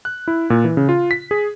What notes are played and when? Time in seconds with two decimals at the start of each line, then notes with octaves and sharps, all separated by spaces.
0.05 F#6
0.28 E4
0.50 A#2
0.64 E3
0.77 C#3
0.89 F4
1.11 B6
1.31 G#4